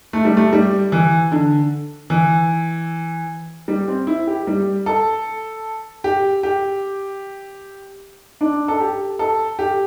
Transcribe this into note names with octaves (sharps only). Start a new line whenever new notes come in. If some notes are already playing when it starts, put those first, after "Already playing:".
A3
G3
A3
G3
E3
D3
E3
G3
C4
E4
G4
G3
A4
G4
G4
D4
A4
G4
A4
G4